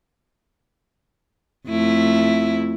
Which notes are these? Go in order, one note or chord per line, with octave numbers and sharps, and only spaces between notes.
F2 A3 E4